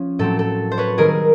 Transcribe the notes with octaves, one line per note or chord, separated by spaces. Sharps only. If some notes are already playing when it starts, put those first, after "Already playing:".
Already playing: F3 C#4
A2 F#3 A3 C4 A4
A4
C5
B4 C#5
D#3 G3 C4 G#4 A#4